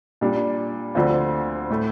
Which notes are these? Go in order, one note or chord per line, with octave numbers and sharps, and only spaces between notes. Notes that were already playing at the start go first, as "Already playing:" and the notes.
A#2 G3 D4
D2 D3 F3 C4 F4
A2 A3